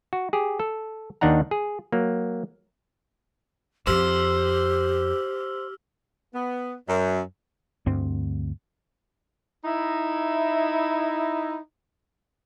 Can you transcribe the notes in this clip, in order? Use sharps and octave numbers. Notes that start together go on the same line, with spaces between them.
F#4
G4 G#4
A4
D#2 D#3 D4 D#4 F#5 A#5
G#4
F#3 A#3
F2 G4 C5 E6 F6
B3
F#2
D2 G2 C4
D#4 E4